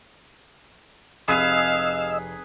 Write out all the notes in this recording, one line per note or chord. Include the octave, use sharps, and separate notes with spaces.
F1 C3 G#4 B4 D#5 F5 E6 D#7